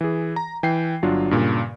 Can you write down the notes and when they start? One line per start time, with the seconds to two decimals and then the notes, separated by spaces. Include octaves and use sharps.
0.01 E3 G#4
0.36 A#5
0.63 E3 G5 C7
1.03 G1 F#3 D4 F4
1.31 G2 A#2 C#3